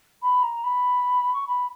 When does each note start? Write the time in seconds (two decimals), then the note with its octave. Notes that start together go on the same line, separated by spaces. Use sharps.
0.22 B5
0.43 A#5
0.64 B5
1.34 C#6
1.47 B5